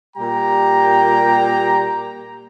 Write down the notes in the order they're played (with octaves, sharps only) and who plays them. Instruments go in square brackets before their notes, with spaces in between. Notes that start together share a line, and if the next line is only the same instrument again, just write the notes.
[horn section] A#2 G3 G4 G5 A#5